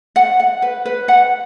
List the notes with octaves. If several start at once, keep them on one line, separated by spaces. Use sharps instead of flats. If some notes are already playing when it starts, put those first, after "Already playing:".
F#5
F#5
B4
B4
F#5